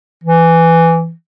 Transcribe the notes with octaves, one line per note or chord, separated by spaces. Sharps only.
E3